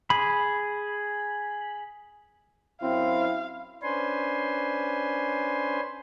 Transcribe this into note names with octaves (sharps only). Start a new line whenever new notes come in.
G#4 B5
F#2 C4 E4 F5
C#4 D4 B4 C5 G#5 C6